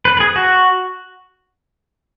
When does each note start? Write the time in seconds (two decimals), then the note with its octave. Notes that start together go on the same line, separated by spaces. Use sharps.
0.05 B4
0.17 B4
0.20 G#4
0.36 F#4